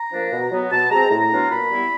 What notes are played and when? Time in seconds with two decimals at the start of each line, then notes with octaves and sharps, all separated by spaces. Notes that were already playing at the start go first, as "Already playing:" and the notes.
Already playing: A#5
0.12 F3 A#3 D4
0.32 B2
0.51 F#3 B3
0.71 B2 A5
0.90 G#3 C4 A#5
1.10 A2 A#5
1.31 F#3 B3 D4 F4
1.51 A#2 B5
1.70 G3 B3 E4